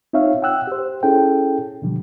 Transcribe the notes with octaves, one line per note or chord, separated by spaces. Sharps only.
C4 D#4 F4 C#5 E5 F5
F#5 G5 E6 F#6
G4 C5
C#4 E4 G#4 A4 G5
B2 D3 F3 G3